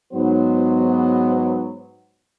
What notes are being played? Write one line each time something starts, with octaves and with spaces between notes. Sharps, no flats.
G#2 F#3 B3 C5